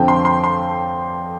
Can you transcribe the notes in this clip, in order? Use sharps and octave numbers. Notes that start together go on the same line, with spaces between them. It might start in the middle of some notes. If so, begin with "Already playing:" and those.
Already playing: F2 D3 F3 C4 G5
C6
C6
C6